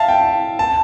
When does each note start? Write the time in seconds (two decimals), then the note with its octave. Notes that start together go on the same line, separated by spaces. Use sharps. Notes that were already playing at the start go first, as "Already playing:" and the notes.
Already playing: E5 F5 A5
0.08 G5
0.59 A5